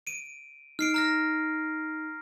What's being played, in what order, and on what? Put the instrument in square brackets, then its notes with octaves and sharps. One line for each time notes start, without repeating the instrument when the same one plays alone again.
[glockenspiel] D7 D#7
[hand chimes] D#4 [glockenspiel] F6 C7 D7
[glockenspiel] A#5 F6 A#6